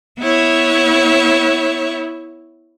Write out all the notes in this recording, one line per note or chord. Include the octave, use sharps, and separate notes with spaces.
B3 E4 C#5 E5